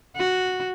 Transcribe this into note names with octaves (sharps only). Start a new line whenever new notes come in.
F#4